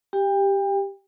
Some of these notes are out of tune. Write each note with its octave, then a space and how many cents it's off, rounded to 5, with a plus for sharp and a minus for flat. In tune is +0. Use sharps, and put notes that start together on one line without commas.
G4 +0 G5 +35